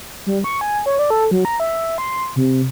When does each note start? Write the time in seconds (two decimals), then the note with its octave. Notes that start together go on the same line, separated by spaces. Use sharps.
0.27 G3
0.44 C#6
0.61 G#5
0.86 C#5
0.99 D5
1.10 A4
1.31 F#3
1.45 A#5
1.60 E5
1.98 C6
2.36 C3